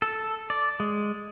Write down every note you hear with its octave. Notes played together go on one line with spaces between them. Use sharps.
A4
D5
G#3